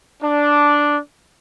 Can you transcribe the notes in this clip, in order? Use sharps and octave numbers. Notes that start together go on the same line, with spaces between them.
D4